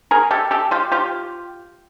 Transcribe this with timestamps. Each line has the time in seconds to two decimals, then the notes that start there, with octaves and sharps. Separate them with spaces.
0.11 G#4 A#4
0.31 G4 A4
0.51 G4 A4
0.71 F4 G4
0.92 F4 G4